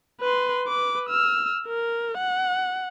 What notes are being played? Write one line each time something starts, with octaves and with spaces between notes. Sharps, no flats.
B4 C6
B4 D6
E6 F6
A#4
F#5